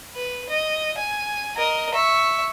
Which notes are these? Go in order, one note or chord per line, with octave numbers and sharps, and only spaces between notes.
B4
D#5
G#5
A#4 D#5
E5 C#6